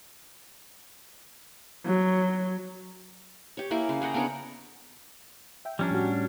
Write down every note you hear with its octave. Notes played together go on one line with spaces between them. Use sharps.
F#3
G4 C#5
A#3 E4 A#4 G#5
C#3
G#4 F#5 G5 A#5
B3 D4 A#4 C#5
E5 G5
F3 G3 C#4 D4 A#5
A2 F#4